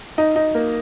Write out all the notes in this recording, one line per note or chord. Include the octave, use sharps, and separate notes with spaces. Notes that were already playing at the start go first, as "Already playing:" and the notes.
D#4
D#4
A#3